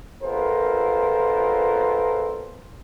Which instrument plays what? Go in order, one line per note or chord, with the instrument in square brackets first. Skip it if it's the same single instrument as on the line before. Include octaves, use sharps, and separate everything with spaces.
[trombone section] A#1 B3 F4 A4 A#4 C5